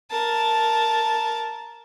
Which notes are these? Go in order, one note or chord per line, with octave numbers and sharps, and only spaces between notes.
A#4 A5